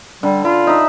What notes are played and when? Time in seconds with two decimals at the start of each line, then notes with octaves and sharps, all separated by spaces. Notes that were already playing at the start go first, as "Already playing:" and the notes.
0.23 D3 G3
0.45 F4 B5
0.67 D#4 E5